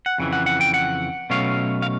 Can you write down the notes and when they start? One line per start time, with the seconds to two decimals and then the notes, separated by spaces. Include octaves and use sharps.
0.06 F#5
0.18 F2 C#3 E3
0.33 F#5
0.46 F#5
0.61 G5
0.74 F#5
1.30 B2 F#3 A3 C#4 F5
1.82 F5